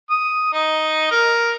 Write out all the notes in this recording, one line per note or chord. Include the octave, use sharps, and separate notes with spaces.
D#6
D#4
A#4